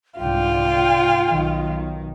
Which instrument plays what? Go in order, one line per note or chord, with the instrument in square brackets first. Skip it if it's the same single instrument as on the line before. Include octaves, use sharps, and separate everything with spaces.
[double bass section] C2 G#2 D3 [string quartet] F4 [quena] G5
[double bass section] B1 D#3